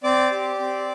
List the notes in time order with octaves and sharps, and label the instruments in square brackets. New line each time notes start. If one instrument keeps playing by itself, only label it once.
[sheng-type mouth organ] C4 D5 D6
G4
C4